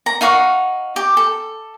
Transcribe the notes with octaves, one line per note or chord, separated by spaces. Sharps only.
A#5
D#4 F5 F#5 C#6
G4
A4